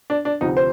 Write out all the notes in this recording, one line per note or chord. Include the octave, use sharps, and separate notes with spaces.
D4
D4
D2 C3 F3 D#4
C5